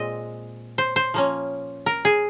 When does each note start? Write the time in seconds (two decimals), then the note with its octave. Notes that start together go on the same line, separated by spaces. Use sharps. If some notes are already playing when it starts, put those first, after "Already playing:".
Already playing: A#2 G#3 C4 D#5
0.78 C5
0.96 C5
1.14 F3 A#3 C#4
1.86 A#4
2.05 G#4